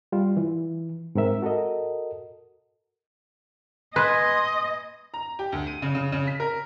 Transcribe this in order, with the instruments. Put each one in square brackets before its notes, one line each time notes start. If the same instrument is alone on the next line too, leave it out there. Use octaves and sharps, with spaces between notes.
[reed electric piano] G3 F4
E3
G#2 C4 A#4 E5
F#4 A4 A#4 D#5
[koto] B4 [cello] D#5 [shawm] G#5 [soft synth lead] C6
[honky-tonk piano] A#5
G4
D2
D#7
C#3
C#3
C#3
B6
A#4